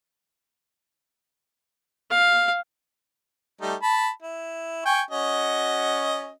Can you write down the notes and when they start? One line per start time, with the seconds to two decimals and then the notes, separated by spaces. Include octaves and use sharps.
2.11 F5
3.61 G3 A3 D#4
3.82 A5 B5
4.22 E4
4.85 G5 G#5 C#6
5.11 C#4 F#4 D#5